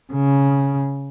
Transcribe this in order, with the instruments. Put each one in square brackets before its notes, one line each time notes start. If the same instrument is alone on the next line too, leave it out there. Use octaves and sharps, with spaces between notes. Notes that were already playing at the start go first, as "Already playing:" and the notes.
[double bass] C#3